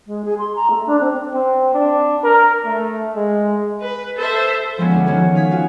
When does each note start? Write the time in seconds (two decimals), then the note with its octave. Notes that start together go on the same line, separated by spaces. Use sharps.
0.06 G#3
0.24 G#4
0.38 C6
0.55 A#5
0.70 A3
0.86 D4
1.00 C4
1.34 C4
1.74 D4
2.24 A#4
2.65 A3
3.15 G#3
3.82 B4
4.17 A4 C5 E5
4.78 F3 G#3 B3 C#4
4.91 D2
5.06 D#3 F3 C#4 F#4 A4 C#5
5.35 F5 C#6 D#6 G#6 B6
5.50 F4 F#4 A4 F5 G#5